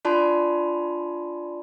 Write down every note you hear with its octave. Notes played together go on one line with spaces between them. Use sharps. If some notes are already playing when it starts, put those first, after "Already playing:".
D4 F4 D5 A5 B5 C6